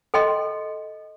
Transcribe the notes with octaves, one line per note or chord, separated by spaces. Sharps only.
A4 D#5 G5 C6